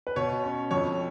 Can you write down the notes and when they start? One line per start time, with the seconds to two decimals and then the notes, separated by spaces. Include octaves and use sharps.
0.07 B4
0.16 B2 C#5
0.44 C#4
0.71 F2 C#5